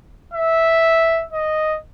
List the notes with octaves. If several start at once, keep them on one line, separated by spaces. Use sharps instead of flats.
E5
D#5